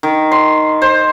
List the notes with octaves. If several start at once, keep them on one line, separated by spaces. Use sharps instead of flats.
D#3
C6
C5